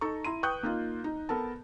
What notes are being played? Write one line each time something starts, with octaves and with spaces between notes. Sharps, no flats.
D#4 A4 A#5 C#6
E4 A#5 C6 D#7
B4 G5 C#6 D#6 F#6 G6
A#3 D#4 F4
D#4
B3 A4 A#4 A5